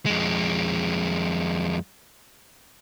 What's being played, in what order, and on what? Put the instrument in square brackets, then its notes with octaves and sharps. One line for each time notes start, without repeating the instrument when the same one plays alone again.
[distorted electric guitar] F2 G#3